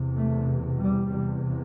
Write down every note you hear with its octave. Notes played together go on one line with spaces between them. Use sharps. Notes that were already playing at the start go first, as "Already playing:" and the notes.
Already playing: E2 C3
A3
G3
E2 C3